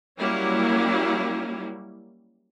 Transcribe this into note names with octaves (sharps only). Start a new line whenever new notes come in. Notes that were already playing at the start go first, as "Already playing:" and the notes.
F#3 G3 A#3 C#4 E4